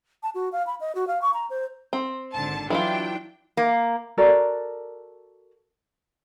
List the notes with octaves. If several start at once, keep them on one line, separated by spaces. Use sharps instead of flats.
A5
F#4
F5
B5
D#5
F#4
F5
C#6
A#5
C5
C4
G#1 D3 A5
E3 F#3 D4 E4 F4 G5
A#3
F#4 A4 A#4 D5